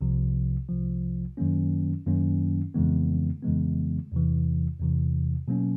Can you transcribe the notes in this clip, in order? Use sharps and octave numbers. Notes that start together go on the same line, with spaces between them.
C2 C3 F3
C2 C3 F3
F#2 D#3 F#3 A#3 C#4
F#2 D#3 F#3 A#3 C#4
F2 C#3 E3 G#3 B3
F2 C#3 E3 G#3 B3
E2 C3 E3
E2 C3 E3
B2 F#3 A#3 C#4